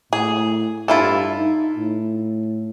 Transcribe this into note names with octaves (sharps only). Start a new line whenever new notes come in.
A2 G#4
G2 E4 F4 A4
D#4
A2